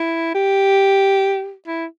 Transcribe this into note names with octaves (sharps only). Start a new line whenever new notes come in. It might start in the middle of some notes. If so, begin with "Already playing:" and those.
Already playing: E4
G4
E4